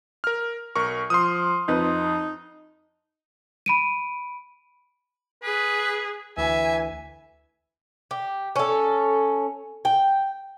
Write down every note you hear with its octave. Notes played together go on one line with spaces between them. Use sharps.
A#4 F6
B1 A#4 C#6
F3 C6 D#6
F2 D#4 B4
B5 D7 D#7
G#4 B4
D2 E3 E5 G#5
G4
C#4 A4
G5